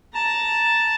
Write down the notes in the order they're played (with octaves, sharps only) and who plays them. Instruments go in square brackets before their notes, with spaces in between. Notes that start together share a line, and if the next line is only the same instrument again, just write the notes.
[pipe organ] A5 [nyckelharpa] A#5